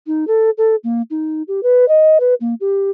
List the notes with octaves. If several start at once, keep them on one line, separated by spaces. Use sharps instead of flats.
D#4
A4
A4
A#3
D#4
G4
B4
D#5
B4
A#3
G4